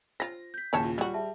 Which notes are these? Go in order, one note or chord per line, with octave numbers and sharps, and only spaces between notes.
F4 C5 A#6
G6 B6
D#2 A#2 C#3 E3 C#5 A5
F4
F#3 G3 F#4
G#4 E5 A5